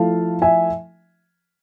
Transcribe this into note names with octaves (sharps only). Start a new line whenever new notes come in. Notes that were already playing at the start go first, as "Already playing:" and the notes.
Already playing: F3 A3 E4 F5 A5
E5 G#5